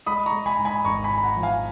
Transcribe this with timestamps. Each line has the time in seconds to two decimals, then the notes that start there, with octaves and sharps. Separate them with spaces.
0.06 G#3 B5 D#6
0.26 A#5 C#6
0.33 G#3
0.46 G#5 B5
0.58 G#2
0.65 G#5 B5
0.85 G#1 A#5 C#6
1.04 G#5 B5
1.11 G#2
1.18 B5
1.24 F#5 A#5
1.37 F3
1.43 F5 G#5